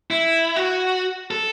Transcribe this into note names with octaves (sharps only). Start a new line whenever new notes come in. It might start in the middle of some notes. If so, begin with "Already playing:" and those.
E4
F#4
A4